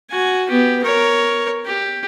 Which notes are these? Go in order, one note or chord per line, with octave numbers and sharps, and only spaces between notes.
F#4 G#5
B3 G4
A#4 C#5
G4